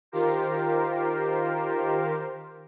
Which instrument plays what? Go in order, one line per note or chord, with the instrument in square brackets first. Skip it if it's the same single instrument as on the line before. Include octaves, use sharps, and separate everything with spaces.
[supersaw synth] D#3 F4 G4 A#4 C5